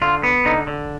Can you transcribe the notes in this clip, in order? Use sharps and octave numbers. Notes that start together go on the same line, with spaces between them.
D3 F4
B3
D3 D#4
D3